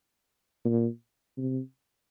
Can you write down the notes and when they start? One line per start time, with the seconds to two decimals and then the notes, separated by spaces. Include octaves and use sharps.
0.65 A#2
1.37 C3